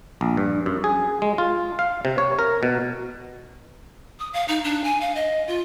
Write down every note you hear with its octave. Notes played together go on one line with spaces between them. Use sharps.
A#1
G2
F#2
G#4
G#3
F4
F5
C3
C#5
A#4
B2
D#6
F5
D#4
D4
G#5
F5
D#5
F4